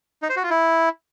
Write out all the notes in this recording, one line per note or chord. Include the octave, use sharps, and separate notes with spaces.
D#4
C5
F#4
F4
E4